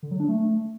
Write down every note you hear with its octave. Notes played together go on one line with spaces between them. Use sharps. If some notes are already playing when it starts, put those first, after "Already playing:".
D3
F#3
D4
A3